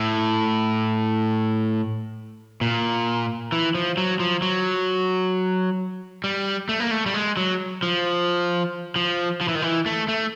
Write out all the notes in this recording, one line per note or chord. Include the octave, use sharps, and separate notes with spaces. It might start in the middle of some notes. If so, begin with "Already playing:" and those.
Already playing: A2
A#2
E3
F3
F#3
F3
F#3
G3
A3
A#3
A3
G3
G#3
F#3
F3
F3
F3
E3
D#3
E3
A3
A3